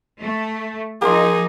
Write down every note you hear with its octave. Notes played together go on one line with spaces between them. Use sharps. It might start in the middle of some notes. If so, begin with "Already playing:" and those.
A3
F3 A#3 D#4 G#4 C6